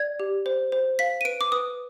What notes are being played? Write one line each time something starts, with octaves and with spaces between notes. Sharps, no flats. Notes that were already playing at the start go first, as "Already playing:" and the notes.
Already playing: D5 G#6
G4
C5
C5
F5 B6
D#7
B4 D7
D6
B4 D#6